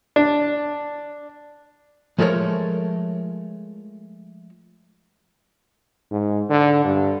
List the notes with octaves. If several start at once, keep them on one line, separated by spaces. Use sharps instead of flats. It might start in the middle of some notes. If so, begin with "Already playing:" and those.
D4
F3 G#3 A3 A#4 C#5
G#2
D3
G2